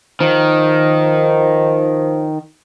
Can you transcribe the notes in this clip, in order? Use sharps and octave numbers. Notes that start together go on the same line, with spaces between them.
D#3 F3